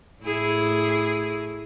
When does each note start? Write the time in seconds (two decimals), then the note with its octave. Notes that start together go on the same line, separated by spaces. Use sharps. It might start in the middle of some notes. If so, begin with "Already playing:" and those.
0.22 A2 E4 G#4